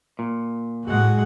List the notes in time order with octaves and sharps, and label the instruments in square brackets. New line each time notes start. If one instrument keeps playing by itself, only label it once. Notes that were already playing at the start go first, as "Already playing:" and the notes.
[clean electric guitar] A#2
[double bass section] A2 G#3 [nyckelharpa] F#4 F#5